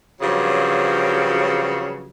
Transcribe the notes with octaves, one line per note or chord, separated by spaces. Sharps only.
G2 C#3 F3 F#3